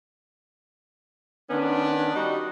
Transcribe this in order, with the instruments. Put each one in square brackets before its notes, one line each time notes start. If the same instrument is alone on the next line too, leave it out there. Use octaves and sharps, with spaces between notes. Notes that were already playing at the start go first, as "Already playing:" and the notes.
[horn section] D#3 B3 C#4 D4
G3 D#4 F#4